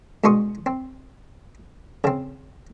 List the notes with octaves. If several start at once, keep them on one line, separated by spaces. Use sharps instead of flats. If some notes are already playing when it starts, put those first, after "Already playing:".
G2 B2 G#3 C6 C#6 D#6
C4
C#3 C4